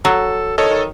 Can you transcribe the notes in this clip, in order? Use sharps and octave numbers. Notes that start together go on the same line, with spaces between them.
F#3 A4
D#3 A4 C#5 D#5
D#3